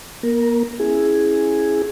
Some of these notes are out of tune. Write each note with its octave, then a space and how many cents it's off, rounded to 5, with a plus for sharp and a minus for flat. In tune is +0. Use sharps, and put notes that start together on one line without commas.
A#3 +40 A#4 +0
C#4 -20 E4 +0 G#4 +0